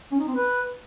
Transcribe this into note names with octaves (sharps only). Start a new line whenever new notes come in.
C#4
D#4
C4
B4